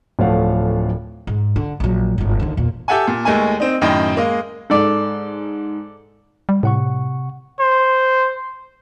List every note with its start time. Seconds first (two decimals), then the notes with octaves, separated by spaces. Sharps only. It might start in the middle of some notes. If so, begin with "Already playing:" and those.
0.19 D1 F3 A3 C#5 F5 F#5
1.27 G#2
1.56 D3
1.80 A#1 F#3
2.18 G1 G#2
2.40 D#2 D3
2.57 E2 A#2
2.88 G4 A4 E5 F#5 G#5
3.07 A#2
3.25 D#2 G#3 A3 A#4 G#5
3.60 C4 D#4
3.81 F#2 A2 D#3 D#5 G5
4.16 G#3 A#3 D#5 F5
4.70 G#2 A4 D5
6.49 G3
6.63 A2 C3 F#5 C#6
7.60 C5